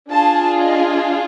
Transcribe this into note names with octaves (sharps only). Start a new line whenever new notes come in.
D4 F4 G#4 A5
D#5